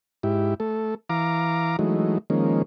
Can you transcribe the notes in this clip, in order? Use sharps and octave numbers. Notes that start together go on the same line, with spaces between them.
G#2 E4 G4
A3 A4
E3 F5 A#5 D6
E3 F#3 G#3 A3 D#4
D#3 F3 G#3 A#3 C#4